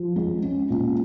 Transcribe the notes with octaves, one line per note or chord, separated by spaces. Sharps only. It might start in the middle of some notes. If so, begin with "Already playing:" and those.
Already playing: F3
G#3
C#4
A#2